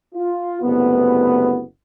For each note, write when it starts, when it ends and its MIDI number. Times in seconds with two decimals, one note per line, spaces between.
0.15 0.57 65
0.62 1.62 30
0.62 1.62 36
0.62 1.62 57
0.62 1.62 59